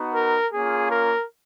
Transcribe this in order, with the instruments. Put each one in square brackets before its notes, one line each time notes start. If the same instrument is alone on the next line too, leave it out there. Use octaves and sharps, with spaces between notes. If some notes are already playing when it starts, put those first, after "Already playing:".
Already playing: [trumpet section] B3 D#4 F#4
A#4
A#3 C#4 F4 G#4
A#4